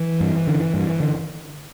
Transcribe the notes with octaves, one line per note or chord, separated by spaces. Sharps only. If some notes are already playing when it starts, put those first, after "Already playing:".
Already playing: E3
G2
D3
G2
D3